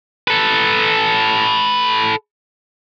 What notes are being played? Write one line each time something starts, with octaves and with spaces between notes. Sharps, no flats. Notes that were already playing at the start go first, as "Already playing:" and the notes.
A4 B4